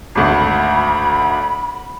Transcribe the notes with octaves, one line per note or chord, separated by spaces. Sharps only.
G#1 D2 B5